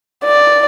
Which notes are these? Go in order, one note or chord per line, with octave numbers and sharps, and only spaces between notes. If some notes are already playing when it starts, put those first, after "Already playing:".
D5